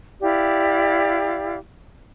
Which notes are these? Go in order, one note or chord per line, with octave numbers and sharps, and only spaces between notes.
E4 G4 D5 F5